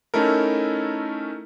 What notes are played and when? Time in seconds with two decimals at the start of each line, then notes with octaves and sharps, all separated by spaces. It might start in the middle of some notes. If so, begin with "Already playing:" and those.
0.14 A3 C#4 D#4 E4 A4 A#4